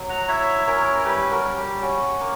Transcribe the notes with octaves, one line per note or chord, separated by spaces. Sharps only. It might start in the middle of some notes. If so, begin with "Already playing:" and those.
Already playing: F#3
F#5 A#5
E4 C#5 E5
C#4 A#4 C#5
A#4
G3 G4 B4
F#4 A#4
G3
G4
C#4 F#4
A#3